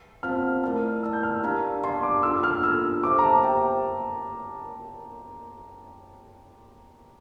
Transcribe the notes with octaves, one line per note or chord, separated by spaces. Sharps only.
C4 F4 C5 F5 A5 F6
A3 E4 A#4 D5 A5 F6
A3 E4 A#4 D5 A5 E6
G6
F6
E6
D4 G4 D5 F5 A5 A#5
D4 G4 D5 F5 A5 C6
D6
D4 F4 A4 E6
F6
D4 F4 A4 E6
G4 C5 E5 D6
A#5
A5
G4 C5 E5 G5